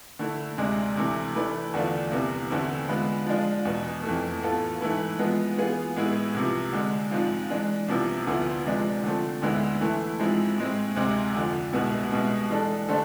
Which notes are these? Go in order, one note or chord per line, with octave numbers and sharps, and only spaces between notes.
D3 A3 E4
D2 C3 G#3 D4
D2 C3 E3 A3
E3 A3 E4 B4 D5
E2 D3 A3 D4 F4
C2 C3 E3 B3
E2 D3 A3 C4 E4
D3 G#3 B3 F4 B4
F3 G#3 D4 F4
E2 B2 B3
F2 E3 A3
A2 E3 B3 F4 A4
G#2 E3 A3 E4 B4
F3 G#3 B3
E3 B3 F4 G#4
A2 G#3 B3 E4 G#4
C2 C3 F3
D3 G#3 D4
G#2 F3 G#3 C4 F4
E3 G#3 D4
C2 C3 F3 B3 E4
D2 D3 F3 B3 E4
C3 F3 G#3 D4
D3 F3 A3 C4
D2 D3 G#3 B3 E4
E3 A3 E4
G#2 F3 G#3 C4 E4
A2 G#3 C4
D2 C3 G#3 C4
F2 D3 F3
C2 B2 G#3 B3 E4
C2 B2 G#3
E3 G#3 D4 A4
D3 A3 D4 A4 C5